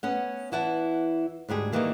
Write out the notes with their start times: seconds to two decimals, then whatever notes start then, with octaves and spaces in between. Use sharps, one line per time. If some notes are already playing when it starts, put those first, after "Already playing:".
0.03 B3 C#4 F#5
0.51 E2 E3 E4 F#5 A5
1.49 D2 G#2 G3 G#4
1.72 D#3 E3 G3 A3 A#3